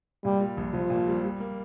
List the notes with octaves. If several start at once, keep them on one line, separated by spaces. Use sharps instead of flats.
A#2 G3
G3
A#1
A#1 F3
A#2
G3
G3
A#3